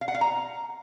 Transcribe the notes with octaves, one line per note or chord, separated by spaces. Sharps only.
F5
F#5
F5
A#5